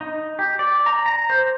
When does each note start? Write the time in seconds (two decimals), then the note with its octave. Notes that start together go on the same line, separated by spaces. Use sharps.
0.01 D#4
0.39 G4
0.59 D5
0.86 A#5
1.06 A#5
1.30 C5